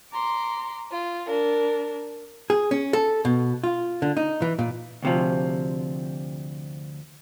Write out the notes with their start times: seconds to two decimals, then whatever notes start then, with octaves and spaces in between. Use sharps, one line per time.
0.12 A#5 C6 D6
0.91 F4
1.26 D4 A#4
2.50 G#4
2.71 C#4
2.93 A4
3.25 B2
3.64 F4
4.02 D3
4.17 D#4
4.42 E3
4.59 A#2
5.03 D2 C3 F3